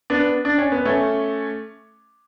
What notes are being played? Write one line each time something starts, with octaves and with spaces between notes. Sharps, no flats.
B3 D4
D4
C#4
B3
A3 C#4